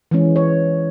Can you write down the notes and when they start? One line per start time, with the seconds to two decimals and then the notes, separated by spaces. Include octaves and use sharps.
0.11 E3 G#3 C#4
0.36 C#5